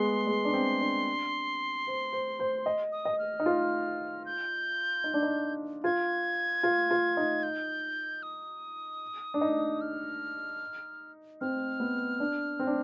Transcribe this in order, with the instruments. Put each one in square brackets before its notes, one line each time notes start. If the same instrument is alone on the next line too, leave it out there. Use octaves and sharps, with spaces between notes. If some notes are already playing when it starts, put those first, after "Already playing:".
Already playing: [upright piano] G#3 B3 [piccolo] C6
[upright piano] G#3
D4
C4
D4
C5
C5
C5
D#5
[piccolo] D#6
[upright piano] D#5
[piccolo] F6
[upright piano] D#4
F4
[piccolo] G6
[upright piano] D#4
D4
D#4
[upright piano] F4 [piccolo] G#6
[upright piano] F4
F4
D#4
[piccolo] G6
D#6
[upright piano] D4
D#4
[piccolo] F6
[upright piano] C4 [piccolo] F6
[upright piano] B3
D4
C4
D4